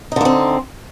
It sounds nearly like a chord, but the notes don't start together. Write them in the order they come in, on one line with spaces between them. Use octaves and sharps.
D#4 D3 A#3 C4